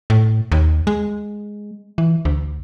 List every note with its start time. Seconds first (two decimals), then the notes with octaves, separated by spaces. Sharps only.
0.10 A2
0.52 D#2
0.87 G#3
1.98 E3
2.25 D2